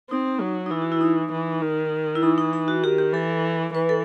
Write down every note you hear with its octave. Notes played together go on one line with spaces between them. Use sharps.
C4 D#4
F#3
D#4
E3 E4
F#4
E4
D#4
E3
D#3
E4
E3 D#4
D#4
D#4
F#4
D#3 G4
G4
E3 A4
E3 B4
A4